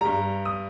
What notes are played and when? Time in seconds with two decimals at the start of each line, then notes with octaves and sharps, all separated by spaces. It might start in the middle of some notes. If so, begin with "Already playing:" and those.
0.01 G2 G3 A#5
0.45 D#6